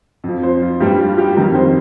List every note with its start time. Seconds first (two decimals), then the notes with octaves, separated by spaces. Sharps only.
0.24 F2 F3
0.43 C5
0.62 F4
0.80 G2 G3 G4
1.00 F4
1.18 G4
1.36 F2 D#3 G3 A#4
1.55 C5